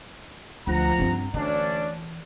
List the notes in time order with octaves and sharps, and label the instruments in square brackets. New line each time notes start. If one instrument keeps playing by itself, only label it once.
[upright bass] D2 [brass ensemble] F3 F#5 A#5
[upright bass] G2 C4
[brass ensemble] D2 C#4 D4 [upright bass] E3